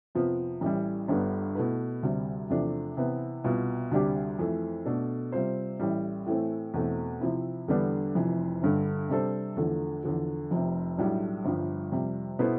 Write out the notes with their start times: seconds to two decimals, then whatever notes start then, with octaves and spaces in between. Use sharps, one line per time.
0.15 F2 C3 F3 B3
0.61 A1 A2 E3 G3
1.08 G1 G2 D3 G3 B3
1.55 B2 A3 E4 B4
2.03 D2 C3 G3
2.50 E2 C3 F3 A3 D4
2.97 C3 E3 B3
3.44 C2 B2 B3 F4
3.91 D2 C3 G3 D4 G4
4.39 F2 E3 A3
4.86 B2 A3 D4 A4
5.32 C3 G3 C4 F4 C5
5.79 A1 A2 G3
6.26 A2 E3 A3 C4
6.74 E2 B2 A3 C4
7.21 C3 F3 C4 E4
7.68 E2 D3 G3 B3 D4
8.15 F1 F2 C3 E3
8.62 G1 G2 D3
9.09 C3 G3 D4 A4 C5
9.57 E2 D3 F3 A3
10.03 E2 D3 F3
10.51 F1 F2 C3
10.98 B1 A2 G3 D4
11.45 G1 G2 F3
11.92 F2 C3 G3
12.39 B2 B3 E4 A4 C5